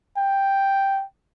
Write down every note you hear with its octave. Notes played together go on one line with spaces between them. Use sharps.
G5